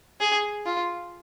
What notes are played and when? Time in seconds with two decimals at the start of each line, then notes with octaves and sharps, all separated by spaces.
0.21 G#4
0.66 F4